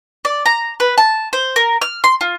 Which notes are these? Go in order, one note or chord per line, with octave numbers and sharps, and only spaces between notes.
D5
A#5
B4
A5
C5
A#4
F6
C6
F4